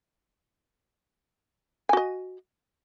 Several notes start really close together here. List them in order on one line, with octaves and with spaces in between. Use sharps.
G#5 F#4 D#5